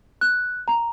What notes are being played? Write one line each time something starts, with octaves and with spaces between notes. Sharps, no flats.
F#6
A#5